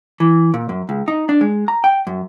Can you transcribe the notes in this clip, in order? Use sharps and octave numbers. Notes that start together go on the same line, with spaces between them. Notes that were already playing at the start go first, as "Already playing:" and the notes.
E3
A#2
F#2
C#2
D#4
D4
G#3
A#5
G5
F#2